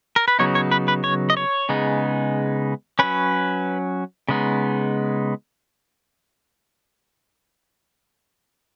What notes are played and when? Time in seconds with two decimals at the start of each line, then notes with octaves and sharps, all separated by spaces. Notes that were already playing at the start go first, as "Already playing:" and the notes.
0.16 A#4
0.28 B4
0.39 C#3 F#3 B3 D#4 C#5
0.55 C#5
0.71 B4
0.88 B4
1.04 C#5
1.30 D#5
1.37 C#5
1.69 C#3 G#3 B3 D#4
2.99 F#3 C#4 B4
4.29 C#3 G#3 B3 D#4